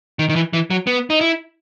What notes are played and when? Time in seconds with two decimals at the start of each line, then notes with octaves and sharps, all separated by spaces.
0.19 D#3
0.29 D#3
0.36 E3
0.53 E3
0.70 F#3
0.87 B3
1.10 D#4
1.21 E4